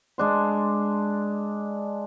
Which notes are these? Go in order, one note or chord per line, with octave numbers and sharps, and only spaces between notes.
G#3 D4 C6